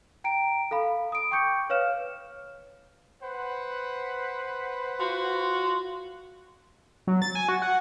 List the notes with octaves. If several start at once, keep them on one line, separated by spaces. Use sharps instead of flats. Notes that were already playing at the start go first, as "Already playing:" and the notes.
G5 A#5 D7
A4 F5 B5
D#6 D7
G5 C#6 D6 G6 C#7
B4 C#5 F5 F6 E7
B4 C5 F#5
F4 F#4
F#3
A6
G#5
F#4
F#5